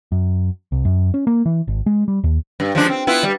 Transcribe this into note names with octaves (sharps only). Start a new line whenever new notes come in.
F#2
C2
F#2
C#4
A#3
E3
G#1
G#3
G3
D#2
G2
F3 G#3 D4
C4
B3 E4 F4
G3